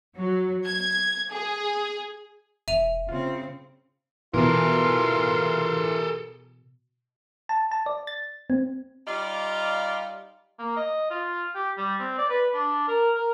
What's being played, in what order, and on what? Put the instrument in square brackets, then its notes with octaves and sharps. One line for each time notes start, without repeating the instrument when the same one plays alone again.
[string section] F#3
G#6
G#4
[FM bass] E1 [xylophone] E5 D#7 F7
[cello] C#3 C4 [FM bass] F4
[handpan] B2 [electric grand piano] E3 [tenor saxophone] F4 [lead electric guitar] A4 A#4
[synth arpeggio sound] A5
A5
D5
A6
C4
[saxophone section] G3 D#4 F4 D5 F5
[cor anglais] A#3
D#5
F4
G4
G3
C4
D5
B4
D4
A#4
A#4